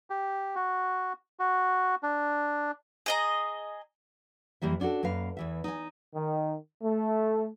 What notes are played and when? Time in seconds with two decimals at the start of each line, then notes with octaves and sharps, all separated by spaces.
0.10 G4
0.55 F#4
1.39 F#4
2.03 D4
3.06 G#4 D#5 A#5
4.62 F2 E3 G3 A#3 E5
4.80 C#4 D4 F4 F#4 A4
5.03 F#2 A#3 B4 F5
5.37 E2 E3 E5
5.64 D#4 G#5
6.15 D#3
6.82 A3